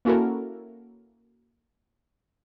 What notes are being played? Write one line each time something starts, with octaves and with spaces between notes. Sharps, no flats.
A#3 C#4 E4 F#4 A4 A#4